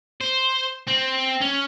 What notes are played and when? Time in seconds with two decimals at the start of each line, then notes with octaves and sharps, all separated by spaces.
0.21 C5
0.88 C4
1.41 C#4